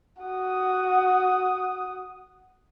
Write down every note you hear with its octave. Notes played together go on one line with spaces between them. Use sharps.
F#4 D#6